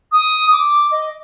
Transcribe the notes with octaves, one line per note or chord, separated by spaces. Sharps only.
D#6
D6
D#5